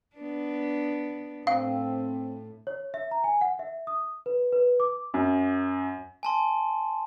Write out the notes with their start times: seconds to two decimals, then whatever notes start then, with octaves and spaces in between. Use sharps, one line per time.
0.16 B3 D4
1.47 A2 C4 F5
2.67 C#5
2.94 E5
3.11 A#5
3.24 G#5
3.41 F#5
3.59 E5
3.87 D#6
4.26 B4
4.52 B4
4.80 D6
5.14 F#2
6.23 G#5 A5 C6